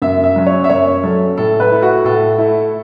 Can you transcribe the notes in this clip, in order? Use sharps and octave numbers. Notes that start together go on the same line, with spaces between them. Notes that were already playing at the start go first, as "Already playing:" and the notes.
F#2 E5
E5
F#3 C#4
C#5
E5
F#2 C#5
F#3 C#4 A4
A2 A4
B4
A3 E4
F#4
A2 A4
A3 E4